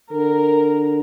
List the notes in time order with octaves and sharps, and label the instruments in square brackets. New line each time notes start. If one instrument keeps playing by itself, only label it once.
[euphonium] D3 [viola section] A#4